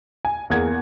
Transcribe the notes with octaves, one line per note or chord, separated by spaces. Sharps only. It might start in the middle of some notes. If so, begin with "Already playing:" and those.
G#5
E2 A#3 G#4 F#5 G#6